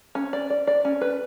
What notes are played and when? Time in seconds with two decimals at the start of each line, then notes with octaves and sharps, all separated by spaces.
0.15 C#4
0.33 D5
0.50 D5
0.67 D5
0.85 C#4
1.01 B4